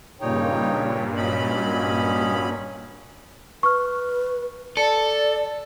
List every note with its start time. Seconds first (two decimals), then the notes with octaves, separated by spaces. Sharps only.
0.21 G2 A#2 C#3 D#4 C#5 G5
1.17 F#3 C#4 D#5 B5
3.63 B4 C#6 F6
4.77 A4 D5 C#7